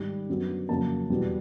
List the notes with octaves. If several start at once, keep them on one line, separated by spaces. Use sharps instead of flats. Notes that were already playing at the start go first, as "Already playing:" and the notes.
Already playing: G#2 D#3 G3
F#2 D3 F#3 B3
F2 C#3 F#3 A#3 A5
E2 B2 G3 B3